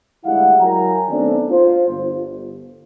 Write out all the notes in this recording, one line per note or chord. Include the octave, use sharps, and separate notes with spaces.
D2 G3 G#3 E4 F5 F#5
F#3 E4 A#4 G5 G#5 A#5
D#3 A3 B3 C4 D4
F4 C5
G1